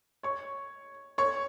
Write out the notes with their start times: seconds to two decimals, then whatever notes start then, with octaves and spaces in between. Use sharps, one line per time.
0.23 C#5 C#6
1.18 C#5 C#6